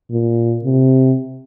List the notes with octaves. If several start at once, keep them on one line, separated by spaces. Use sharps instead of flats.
A#2
C3